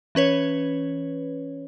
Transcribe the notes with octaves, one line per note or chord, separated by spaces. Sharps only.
E3 C#4 B4 C#5